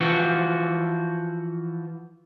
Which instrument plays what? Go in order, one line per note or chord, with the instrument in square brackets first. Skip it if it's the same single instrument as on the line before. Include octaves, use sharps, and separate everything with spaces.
[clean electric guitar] E3 F3 F#4